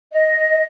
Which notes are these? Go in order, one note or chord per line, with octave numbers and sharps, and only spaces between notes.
D#5